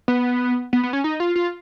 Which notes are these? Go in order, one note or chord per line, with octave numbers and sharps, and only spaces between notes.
B3
B3
B3
C#4
D#4
F4
F4